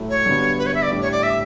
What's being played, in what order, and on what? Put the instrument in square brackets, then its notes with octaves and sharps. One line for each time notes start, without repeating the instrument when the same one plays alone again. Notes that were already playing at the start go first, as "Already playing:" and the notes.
Already playing: [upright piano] A2 F#3 A3 E4
[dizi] C#5
[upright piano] G2 D3 F#3 B3
[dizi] B4
C#5
E5
D5
[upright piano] A2 G3 D4
[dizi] C#5
D5
E5